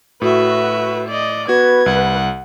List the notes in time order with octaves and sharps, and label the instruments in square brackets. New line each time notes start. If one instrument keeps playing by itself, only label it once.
[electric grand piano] A2 [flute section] F#4 [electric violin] B4 E5
[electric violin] D5 D#5
[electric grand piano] B3 F#4 [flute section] B4 [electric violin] G#6
[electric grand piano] C2 [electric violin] F#5